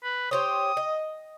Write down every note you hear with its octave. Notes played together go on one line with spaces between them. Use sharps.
B4
G4 C5 C#5 D#6
D#5